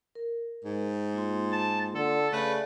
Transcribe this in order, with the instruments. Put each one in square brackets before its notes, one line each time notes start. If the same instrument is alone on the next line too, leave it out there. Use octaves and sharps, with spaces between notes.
[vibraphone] A#4
[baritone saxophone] G#2
[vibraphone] A#3 F4 C6
[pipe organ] A5
[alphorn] D3 [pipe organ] A4
[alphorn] C#3 [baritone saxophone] A3 [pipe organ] B4 [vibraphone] D5 E5